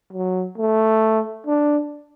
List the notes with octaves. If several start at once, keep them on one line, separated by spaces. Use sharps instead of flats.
F#3
A3
D4